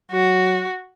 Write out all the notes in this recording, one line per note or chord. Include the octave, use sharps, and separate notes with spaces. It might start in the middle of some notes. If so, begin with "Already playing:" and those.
F#3 F#4